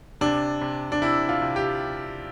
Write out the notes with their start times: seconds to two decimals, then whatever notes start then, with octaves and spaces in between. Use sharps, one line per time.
0.21 C3 D4
0.61 C3
0.92 D4
1.02 C3 E4
1.29 F4
1.42 C3
1.56 G4